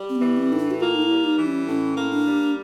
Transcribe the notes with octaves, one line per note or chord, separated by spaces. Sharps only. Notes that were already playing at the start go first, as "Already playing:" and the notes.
Already playing: G3
C4
B3
E3
C4
A2 D#4
D4
F#4
A#3 F4
D#4
E4
G3
D#4
E3
C#4
A2 C#4
A#3
D4
G3